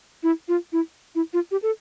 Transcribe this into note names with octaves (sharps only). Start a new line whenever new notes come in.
E4
F4
E4
E4
F4
G4
A4